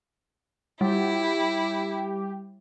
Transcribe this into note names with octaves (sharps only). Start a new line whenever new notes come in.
G3 E4 G4